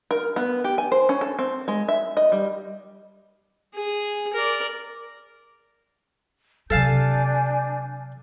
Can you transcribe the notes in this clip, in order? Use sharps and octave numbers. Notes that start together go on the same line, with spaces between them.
A#4
B3
G4
G#5
C5
C#4
A4
C4
G#3
E5
D#5
G3
G#4
A#4 D5
C3 F#3 D4 A4 F5 G#5 A5 G6